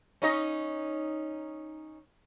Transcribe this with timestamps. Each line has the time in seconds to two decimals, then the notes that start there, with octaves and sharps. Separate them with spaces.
0.22 C#4 D#4 D#5